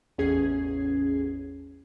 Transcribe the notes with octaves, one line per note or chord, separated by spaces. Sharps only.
A1 E2 C#4 G#4 G#6 C7